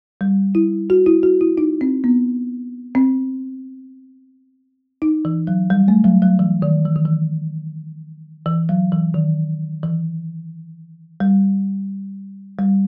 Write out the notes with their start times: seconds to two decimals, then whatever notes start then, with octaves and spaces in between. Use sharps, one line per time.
0.21 G3
0.55 E4
0.90 F#4
1.06 E4
1.23 F#4
1.41 E4
1.58 D#4
1.81 C4
2.04 B3
2.95 C4
5.02 D#4
5.25 E3
5.47 F#3
5.70 G3
5.88 A3
6.04 F#3
6.22 F#3
6.39 E3
6.62 D#3
6.85 E3
6.96 D#3
7.05 E3
8.46 E3
8.69 F#3
8.92 E3
9.14 D#3
9.83 E3
11.20 G3
12.59 G3